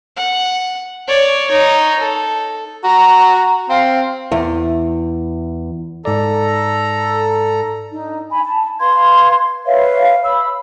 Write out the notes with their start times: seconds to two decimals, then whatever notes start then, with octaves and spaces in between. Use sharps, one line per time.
0.17 F#5
1.08 C#5 D5
1.48 D#4 C#5
2.00 A4
2.84 F#4 A#5
3.70 C4 F5
4.32 E2
6.05 G#2 A4 D5 A#5
7.91 D4 D#4
8.30 G#5 B5
8.43 A5
8.81 B4 F5 C6 G#6
9.66 B4 C#5 E5 F5
10.23 B5 E6